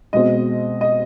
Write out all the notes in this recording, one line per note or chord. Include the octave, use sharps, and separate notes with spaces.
B2 G#3 C4 D#5
D#5